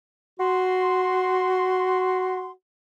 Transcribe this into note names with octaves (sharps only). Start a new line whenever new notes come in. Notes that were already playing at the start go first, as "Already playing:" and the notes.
F#4 C6